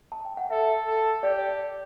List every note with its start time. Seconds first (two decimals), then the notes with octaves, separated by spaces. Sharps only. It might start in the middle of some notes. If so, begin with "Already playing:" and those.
0.12 A5
0.25 G5
0.37 F#5
0.50 A4 E5
0.86 A4
1.22 G4 D5